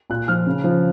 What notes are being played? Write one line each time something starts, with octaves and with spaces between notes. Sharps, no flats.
A#2 F#6
F3 F6
C#3
F3